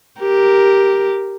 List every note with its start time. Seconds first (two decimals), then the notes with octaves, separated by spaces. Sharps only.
0.20 G4 A#4